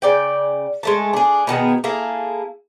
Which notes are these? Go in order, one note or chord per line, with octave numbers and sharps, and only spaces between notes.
C#3 D5 G5
G#3 A3 A5
D4 G#4
B2 D#3 B3 G#4
A#3 E4 G#4 A4